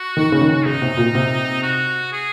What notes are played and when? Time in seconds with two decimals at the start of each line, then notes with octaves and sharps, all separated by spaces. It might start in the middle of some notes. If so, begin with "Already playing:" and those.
Already playing: F#4
0.17 D#3
0.32 C#3
0.41 D#3
0.65 C#3 D#4
0.82 C3
0.97 A#2
1.15 C3
1.63 F#4
2.12 G#4